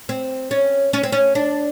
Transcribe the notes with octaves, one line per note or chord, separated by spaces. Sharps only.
C4
C#4
C#4
C4
C#4
D4